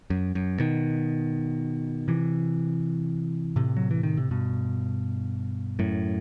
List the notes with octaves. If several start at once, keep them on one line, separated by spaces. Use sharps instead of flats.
F#2
F#2
B2 D#3
C3 E3
A2 C3
F#3
E3
D#3
C3
G2 B2
F#2 A2